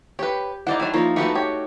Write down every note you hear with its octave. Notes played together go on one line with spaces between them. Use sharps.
G4 B4 C#5
D#4 E4 C5 D5 F#5
D#3 F#3 D4 E5
F3 A#3 D#4 C#5 D5
E3 A3 B3 F#4 G4 C#6
G4 C#5